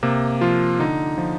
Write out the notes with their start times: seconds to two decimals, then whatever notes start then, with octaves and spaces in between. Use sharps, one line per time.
0.03 C3 A#3
0.41 F3 F4
0.80 D3 D#4
1.18 F3